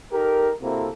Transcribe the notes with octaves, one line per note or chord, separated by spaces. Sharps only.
D#4 G4 A4 A#4
C3 A#3 C4 E4 F#4 A4